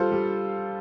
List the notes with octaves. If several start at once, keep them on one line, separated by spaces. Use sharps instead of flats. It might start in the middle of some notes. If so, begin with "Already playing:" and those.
Already playing: G3 F4 A4 C5
G3